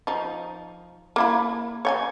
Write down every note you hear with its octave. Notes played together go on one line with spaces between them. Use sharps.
F3 D#4
A#3 E4 B5
C#5 G5 G#5